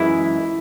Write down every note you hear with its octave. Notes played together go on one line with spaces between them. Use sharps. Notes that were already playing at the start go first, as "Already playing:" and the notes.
Already playing: F#2 E3 G#3 E4